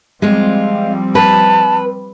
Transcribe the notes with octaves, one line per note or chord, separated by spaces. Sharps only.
F3 G3 G#3 C4 F4
B4 A5